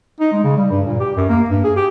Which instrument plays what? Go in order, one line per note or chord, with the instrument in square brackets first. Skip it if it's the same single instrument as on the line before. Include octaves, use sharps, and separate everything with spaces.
[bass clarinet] D#4
G#3
C#3
G3
G2
A#2
G4
F#2
A#3
G2
G#4
G4